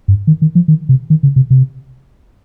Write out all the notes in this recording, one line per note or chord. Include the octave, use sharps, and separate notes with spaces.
G2
D#3
D#3
F3
D#3
C3
D#3
C#3
C3
C3